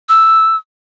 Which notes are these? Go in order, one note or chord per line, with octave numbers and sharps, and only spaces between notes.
E6